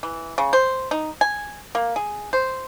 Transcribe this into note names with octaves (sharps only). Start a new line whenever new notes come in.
E3
C#3
C5
D#4
G#5
A#3
G#4
C5